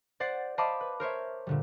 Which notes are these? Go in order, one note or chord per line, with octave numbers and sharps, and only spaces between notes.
C5 D5 F#5 A6 C7
C5 D#5 F5 A5 B5 D6
B4
A#4 C5 C#5 E5
A#2 D3 G3